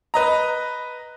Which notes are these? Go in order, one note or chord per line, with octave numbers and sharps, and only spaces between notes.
B4 D#5 A#5